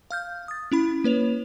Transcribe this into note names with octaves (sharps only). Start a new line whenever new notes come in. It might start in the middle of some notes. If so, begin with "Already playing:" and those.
F5 F6 G6
D#6 A6
C#4 E4 B5
A#3 B4 C#5 F7